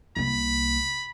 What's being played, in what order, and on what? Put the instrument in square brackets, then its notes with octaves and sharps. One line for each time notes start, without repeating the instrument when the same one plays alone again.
[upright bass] C2 A#3 [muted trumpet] B5